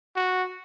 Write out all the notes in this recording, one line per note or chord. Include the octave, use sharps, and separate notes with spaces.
F#4